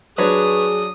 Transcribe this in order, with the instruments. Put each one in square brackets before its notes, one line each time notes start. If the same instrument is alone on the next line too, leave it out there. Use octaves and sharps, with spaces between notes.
[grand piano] F#3 D4 [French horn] G#4 [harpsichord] B4 C#5 C#6 [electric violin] D#6